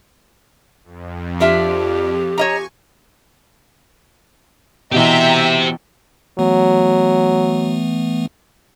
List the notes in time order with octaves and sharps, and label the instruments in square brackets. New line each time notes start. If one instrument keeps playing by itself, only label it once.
[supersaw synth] F2
[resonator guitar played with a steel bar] D4 F4 E5 [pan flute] G4
[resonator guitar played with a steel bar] C#5 D#5 A#5 [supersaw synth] G#5 C#6
[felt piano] B2 E3 [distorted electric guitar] G4 C5 [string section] E5 G5 A#5
[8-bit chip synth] E3 A3 B3 [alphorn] F#3